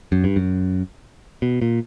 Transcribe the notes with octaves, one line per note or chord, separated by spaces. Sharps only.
F#2
G2
F#2
B2
A#2